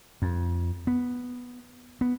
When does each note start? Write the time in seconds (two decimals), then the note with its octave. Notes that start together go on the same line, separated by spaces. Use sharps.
0.22 F2
0.87 B3
2.01 B3